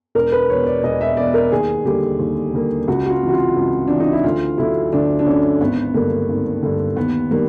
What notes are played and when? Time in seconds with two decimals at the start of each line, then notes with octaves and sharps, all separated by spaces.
0.15 E1 A#4
0.32 B4
0.49 E2 B2 C#5
0.66 D5
0.83 E1 D#5
1.01 E5
1.17 E2 B2 D5
1.34 A#4
1.52 D#2 G#4
1.85 D3 G3 A#3 G4
2.19 D#2
2.54 D3 G3 A#3
2.88 C#2 F#4
3.06 F#4
3.10 F4
3.22 C3 E3
3.29 F#4
3.33 F4
3.56 C#2
3.88 C3 E3 D4
4.00 D#4
4.12 E4
4.24 D2 F4
4.58 D3 F#3 A3 E4
4.93 D2 D4
5.19 D4
5.26 D3 F#3 A3 C#4
5.60 G#1 B3
5.94 G2 D3 A#3
6.29 G#1
6.63 G2 D3
6.96 D#2 B3
7.31 D#3 G3 A#3